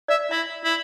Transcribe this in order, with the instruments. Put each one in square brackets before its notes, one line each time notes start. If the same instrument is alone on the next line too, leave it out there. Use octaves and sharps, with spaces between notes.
[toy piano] D5 [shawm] E5
[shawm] E4 [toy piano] E5
[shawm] E4